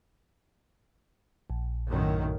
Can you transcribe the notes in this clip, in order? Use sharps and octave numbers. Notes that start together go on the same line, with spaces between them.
A#1
F#2 A2 D#3